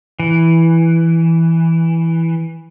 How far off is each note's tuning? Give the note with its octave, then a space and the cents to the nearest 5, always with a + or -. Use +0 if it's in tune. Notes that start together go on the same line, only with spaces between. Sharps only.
E3 +0